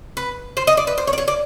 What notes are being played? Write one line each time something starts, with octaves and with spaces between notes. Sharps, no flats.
B4
C5
D#5
D5
B4
C5
C#5
D5
C#5
D5